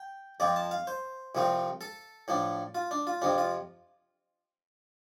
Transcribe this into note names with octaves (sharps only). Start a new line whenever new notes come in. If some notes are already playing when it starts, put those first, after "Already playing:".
Already playing: G5
F2 F3 C4 D5
A5
F5
C5
C2 C3 F3 A3 C4
A4
A2 F3 D4
F4
D4
F4
F2 C3 F3 D4
F4